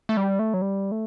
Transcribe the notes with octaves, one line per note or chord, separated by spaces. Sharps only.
A3
G3
A3
F#3
G3
A3